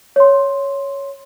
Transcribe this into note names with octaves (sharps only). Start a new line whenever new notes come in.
C#5 C6